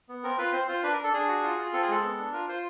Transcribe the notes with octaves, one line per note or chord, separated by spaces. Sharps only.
B3
C4 A#4
F4 B4
C4 C5
F4 C5
D4 B4
A#4
D4
A4
D4 G#4
F#4
F4
F4
C4 A4
G#4
G#3 A4
B3
D4
F4 A#4
F4 C5